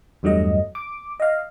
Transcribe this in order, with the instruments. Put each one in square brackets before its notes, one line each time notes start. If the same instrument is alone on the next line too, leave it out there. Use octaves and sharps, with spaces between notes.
[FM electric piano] E2 G2 F#3 A3 D#5
D6
D#5 F5